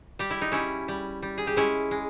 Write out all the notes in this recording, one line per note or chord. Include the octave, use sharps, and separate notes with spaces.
G3 G4
E4
D#4
G3 C#4 E4
G3
G3
G#4
G4
G#3 C#4 E4
G#3